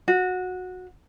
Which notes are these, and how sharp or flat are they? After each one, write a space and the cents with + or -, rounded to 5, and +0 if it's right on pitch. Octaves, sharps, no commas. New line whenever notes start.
F#4 -15